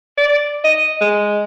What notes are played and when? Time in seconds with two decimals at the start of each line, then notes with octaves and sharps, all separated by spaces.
0.18 D5
0.64 D#5
1.01 G#3